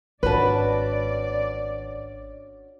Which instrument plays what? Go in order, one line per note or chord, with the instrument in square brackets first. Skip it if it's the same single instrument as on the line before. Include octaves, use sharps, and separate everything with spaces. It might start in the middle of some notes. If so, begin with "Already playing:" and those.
[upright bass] G#1 [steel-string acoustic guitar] C#4 D4 F#4 [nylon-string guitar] B4 A5 [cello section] D5